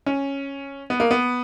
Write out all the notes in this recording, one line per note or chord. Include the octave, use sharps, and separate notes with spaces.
C#4
B3
A#3
B3